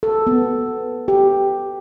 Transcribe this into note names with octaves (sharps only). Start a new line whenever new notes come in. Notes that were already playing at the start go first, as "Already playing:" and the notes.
A4
B3
G4